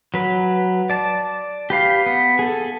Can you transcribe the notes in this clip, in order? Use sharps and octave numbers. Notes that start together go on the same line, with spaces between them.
F#3 B4
D5 A5
G4 B4 F5
B3
G#4 A4